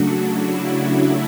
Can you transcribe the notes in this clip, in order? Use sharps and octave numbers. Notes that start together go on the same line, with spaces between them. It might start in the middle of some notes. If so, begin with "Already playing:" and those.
Already playing: C#3 F#3 A3 D4 F#4
E4